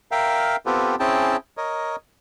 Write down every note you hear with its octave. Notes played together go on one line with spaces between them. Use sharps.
A#4 E5 F5 G5
B3 C4 F4 G4 A4 B4
C4 C#4 E4 G#4 G5 A5
A#4 C#5 D#5